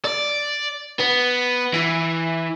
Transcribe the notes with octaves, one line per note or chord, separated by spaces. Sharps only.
D5
B3
E3